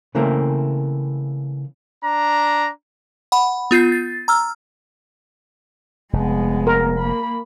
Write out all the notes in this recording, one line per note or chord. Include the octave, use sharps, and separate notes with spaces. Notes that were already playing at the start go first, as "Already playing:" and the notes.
C#3 E3 A3 A#3 C4
D4 A#5
F#5 B5
B3 F4 G6 C7
A6
A#5 E6 F6
F1 G#3 B3
A#4
A#3 B5